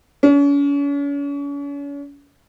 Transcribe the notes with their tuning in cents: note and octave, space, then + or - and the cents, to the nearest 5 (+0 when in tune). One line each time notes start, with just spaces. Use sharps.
C#4 +40